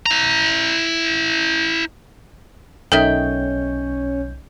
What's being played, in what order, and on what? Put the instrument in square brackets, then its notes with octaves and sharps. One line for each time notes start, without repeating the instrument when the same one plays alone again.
[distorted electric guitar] E4 A#5
[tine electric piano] B1 G6 [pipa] D#3 D#4 G5 [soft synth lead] C#4 [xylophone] A4 E5